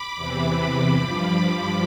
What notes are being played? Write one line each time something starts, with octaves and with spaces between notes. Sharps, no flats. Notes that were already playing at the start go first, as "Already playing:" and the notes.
Already playing: B5 D6
E2 C3 E3
G2 F3 B5 D6